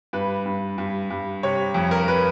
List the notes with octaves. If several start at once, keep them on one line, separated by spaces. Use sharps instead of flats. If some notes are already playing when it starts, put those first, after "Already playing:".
G2 B4
G2
G2
G2
C3 C#5
F2
A#4
B4